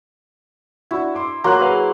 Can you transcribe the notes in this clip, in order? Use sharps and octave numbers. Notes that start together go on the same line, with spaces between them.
D4 E4 F#4 C#6
C6 D6
F#3 A#3 A#5 C6 F#6
G#4 B4 F5